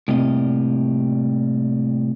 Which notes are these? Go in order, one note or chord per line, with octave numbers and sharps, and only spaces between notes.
A2 C3 G3 A#3 D#5